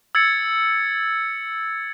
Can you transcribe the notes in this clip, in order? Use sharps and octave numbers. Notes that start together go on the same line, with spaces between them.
E6 G#6 A6 C#7